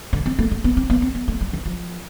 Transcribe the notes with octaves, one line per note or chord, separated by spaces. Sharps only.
D3
C4
A3
A3
B3
C4
B3
C4
B3
A3
G3
E3
F3